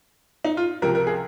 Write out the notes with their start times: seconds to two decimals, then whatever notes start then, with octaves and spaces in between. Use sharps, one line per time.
0.45 D#4
0.57 F4
0.82 C#2 C3 F3 A#4
0.95 A#4
1.07 G#4